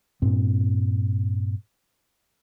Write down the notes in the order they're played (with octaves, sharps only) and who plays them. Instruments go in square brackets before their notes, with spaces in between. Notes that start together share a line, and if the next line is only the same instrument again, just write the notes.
[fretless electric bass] G2 A#2 C4